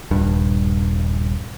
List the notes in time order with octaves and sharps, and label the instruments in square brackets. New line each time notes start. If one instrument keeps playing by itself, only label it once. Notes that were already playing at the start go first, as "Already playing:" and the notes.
[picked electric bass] D#1 G2